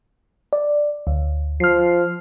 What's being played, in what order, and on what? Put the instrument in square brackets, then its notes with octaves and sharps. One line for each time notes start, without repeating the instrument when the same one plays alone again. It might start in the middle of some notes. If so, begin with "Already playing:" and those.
[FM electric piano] D5
D2
[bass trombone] F3 [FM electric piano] F6 C7